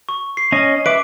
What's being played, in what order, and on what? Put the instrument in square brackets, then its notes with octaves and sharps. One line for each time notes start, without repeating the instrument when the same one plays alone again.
[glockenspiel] C#6
C7
[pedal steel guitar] C#4 D#5
[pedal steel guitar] B4 E5 D6 [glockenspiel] D7